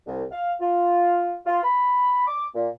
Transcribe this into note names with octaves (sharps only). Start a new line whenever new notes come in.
C2
F5
F4
F4
B5
D6
A#2